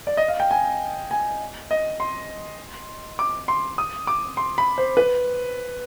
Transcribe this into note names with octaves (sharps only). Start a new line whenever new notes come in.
D5
D#5
F5
G5
G#5
G#5
D#5
C6
D6
C6
D#6
D6
C6
B5
C5
B4